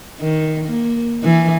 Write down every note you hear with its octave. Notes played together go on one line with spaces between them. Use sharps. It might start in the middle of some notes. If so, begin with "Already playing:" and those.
D#3
A#3
E3